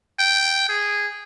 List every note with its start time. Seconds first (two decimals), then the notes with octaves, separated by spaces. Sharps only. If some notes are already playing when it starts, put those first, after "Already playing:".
0.19 G5
0.69 G#4